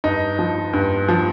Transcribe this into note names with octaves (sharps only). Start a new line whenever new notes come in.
G2 D#4
F3
G2
F3